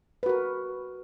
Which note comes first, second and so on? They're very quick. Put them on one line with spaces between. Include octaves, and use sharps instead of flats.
B4 F#4 A#4